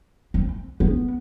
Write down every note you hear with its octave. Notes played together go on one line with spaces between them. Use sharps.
C4
B3